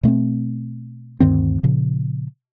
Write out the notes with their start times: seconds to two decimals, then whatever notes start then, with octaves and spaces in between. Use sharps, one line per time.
0.03 B2 A3 B3 C4
1.20 D2 G2 D#3 C4
1.63 A#2 C#3 F3